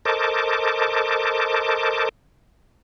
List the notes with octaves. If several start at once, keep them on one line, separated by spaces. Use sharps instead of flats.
A4 A#4 C5 D#5 A5 D6